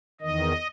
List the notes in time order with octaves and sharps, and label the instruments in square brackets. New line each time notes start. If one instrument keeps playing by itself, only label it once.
[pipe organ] E2 D#3 D#5